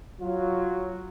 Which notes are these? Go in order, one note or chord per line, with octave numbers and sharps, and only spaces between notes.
F#3 F4